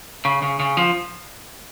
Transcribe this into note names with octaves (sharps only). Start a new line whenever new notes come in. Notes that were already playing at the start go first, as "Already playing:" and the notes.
C#3
C#3
C#3
F3